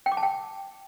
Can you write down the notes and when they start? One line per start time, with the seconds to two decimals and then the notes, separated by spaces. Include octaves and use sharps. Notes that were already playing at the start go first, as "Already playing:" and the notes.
0.06 G5
0.12 D6
0.17 A5
0.23 G5